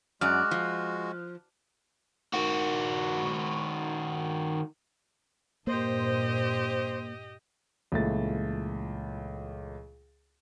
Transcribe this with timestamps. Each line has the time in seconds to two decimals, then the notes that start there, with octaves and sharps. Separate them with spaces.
0.21 F#2 G#3 F#4 D5 F6 F#6
0.51 F3
2.34 D#3 F#4
5.67 G2 A#2 A#3 G4 C5 D#5
7.92 C#2 A#2 E3 A3 A6